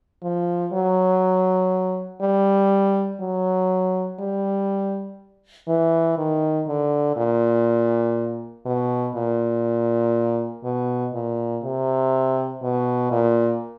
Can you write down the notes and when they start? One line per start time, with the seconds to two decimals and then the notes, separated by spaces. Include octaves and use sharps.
0.23 F3
0.73 F#3
2.22 G3
3.21 F#3
4.20 G3
5.68 E3
6.18 D#3
6.67 D3
7.17 A#2
8.65 B2
9.15 A#2
10.64 B2
11.14 A#2
11.63 C3
12.62 B2
13.11 A#2